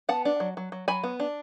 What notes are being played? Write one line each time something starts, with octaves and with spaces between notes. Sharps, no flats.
B3 F#5 A5
D4
F#3
F#3
F#3
F#3 G#5 B5
B3
D4